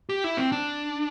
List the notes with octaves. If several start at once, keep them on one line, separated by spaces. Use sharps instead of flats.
G4
E4
C4
D4